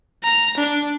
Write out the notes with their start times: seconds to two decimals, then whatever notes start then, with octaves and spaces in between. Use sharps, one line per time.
0.23 A#5
0.57 D4